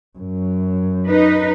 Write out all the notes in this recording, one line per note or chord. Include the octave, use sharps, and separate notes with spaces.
F#2
D#4 B4